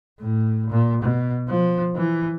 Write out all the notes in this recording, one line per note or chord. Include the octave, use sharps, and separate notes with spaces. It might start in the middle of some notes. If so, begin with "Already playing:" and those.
A2
A#2
B2
F3
E3